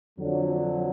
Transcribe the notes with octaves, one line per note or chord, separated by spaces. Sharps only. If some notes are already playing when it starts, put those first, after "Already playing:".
F2 D3 F#3